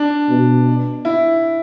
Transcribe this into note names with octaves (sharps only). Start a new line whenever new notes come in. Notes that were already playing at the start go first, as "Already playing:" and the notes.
Already playing: D4
B2
E4